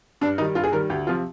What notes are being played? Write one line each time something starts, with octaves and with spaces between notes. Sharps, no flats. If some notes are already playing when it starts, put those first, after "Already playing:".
G2 D4
D#3 G3 D#4
G2 F4
G#4
D#3 G3 A#4
D2 G4
C3 F3 F4